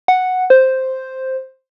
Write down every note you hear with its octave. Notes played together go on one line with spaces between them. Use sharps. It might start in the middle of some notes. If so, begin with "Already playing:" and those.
F#5
C5